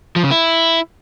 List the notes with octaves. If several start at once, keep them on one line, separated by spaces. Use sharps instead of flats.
F3
C#3
E4